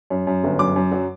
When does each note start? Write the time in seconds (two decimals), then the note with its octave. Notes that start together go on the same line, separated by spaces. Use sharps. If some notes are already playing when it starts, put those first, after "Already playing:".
0.10 F#2
0.27 F#2
0.43 G1
0.59 F#2 D6
0.76 F#2
0.92 F#3